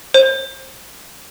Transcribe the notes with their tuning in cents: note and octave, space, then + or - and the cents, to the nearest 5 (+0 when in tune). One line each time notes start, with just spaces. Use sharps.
C5 +25